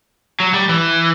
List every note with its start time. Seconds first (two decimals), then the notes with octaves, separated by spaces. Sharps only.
0.40 F#3
0.54 G3
0.69 E3